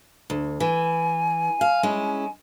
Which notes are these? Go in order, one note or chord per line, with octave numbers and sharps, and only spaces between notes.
D2
E3 G#5
F5
G#3 C#4 E4